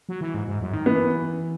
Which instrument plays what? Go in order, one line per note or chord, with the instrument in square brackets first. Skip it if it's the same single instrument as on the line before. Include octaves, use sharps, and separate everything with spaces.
[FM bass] F#3
E3
G#2
G#2
F#2
D#3
[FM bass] E3 [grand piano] B3